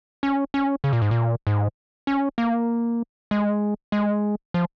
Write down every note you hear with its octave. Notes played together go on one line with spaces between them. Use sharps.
C#4
C#4
C#3
A#2
G#2
A#2
G#2
C#4
A#3
G#3
G#3
F3